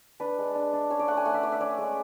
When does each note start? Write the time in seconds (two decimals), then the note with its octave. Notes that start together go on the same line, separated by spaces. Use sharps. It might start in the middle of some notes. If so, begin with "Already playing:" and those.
0.20 D4 B4
0.38 G#3
0.55 D4
0.73 D4
0.90 C#4 C#5
0.99 D5
1.08 A3 F#5
1.17 G#5
1.25 A3 F#5
1.34 E5
1.43 A3 D5
1.52 E5
1.61 C#4 D5
1.78 G#3